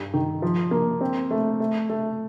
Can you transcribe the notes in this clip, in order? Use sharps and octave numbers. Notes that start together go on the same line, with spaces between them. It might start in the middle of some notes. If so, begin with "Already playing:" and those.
Already playing: G2
D#3
F3
A#3
C4
A3
A3
A3